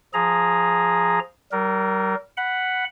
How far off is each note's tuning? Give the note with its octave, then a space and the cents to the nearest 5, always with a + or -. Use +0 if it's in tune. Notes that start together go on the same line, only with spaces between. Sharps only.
F3 +0 G#4 +0 A#5 +0
G3 -40 A#4 +0
F#5 +0 B5 +0